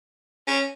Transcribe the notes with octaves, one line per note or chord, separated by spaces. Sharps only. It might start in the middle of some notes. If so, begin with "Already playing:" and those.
C#4